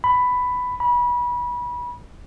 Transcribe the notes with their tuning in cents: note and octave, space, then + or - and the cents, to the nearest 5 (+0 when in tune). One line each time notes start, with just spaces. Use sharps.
B5 +10
B5 -25